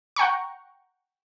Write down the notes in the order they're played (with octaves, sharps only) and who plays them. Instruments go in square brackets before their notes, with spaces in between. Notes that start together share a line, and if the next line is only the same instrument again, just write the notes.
[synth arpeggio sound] F#5 G5 A#5 C#6